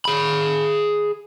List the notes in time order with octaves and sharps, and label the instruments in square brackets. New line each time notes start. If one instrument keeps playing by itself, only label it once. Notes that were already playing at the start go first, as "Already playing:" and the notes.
[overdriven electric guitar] G#4 B5